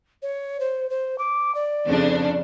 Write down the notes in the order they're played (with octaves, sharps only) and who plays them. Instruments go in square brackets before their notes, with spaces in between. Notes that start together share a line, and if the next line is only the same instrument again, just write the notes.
[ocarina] C#5
C5
C5
D6
D5
[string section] F2 C#3 D4